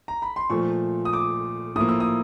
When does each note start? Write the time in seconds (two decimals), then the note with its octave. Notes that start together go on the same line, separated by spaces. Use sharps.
0.08 A#5
0.22 B5
0.36 C6
0.50 A#2 F3 A3 C#6
1.05 D#6
1.13 D6
1.76 A2 F3 A#3 D#6
1.89 E6
2.00 D#6